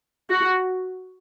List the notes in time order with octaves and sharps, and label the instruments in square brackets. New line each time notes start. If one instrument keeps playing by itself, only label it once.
[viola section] F#4